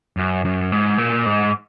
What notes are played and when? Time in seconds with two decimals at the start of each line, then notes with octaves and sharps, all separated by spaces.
0.17 F#2
0.45 F#2
0.72 G#2
0.98 A#2
1.26 G#2